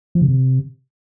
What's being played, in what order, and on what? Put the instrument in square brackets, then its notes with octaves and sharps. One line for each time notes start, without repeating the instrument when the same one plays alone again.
[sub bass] F3
C#3
C3